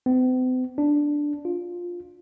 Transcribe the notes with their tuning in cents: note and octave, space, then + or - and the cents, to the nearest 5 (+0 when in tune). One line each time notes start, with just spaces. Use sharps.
C4 -45
D4 +0
F4 +10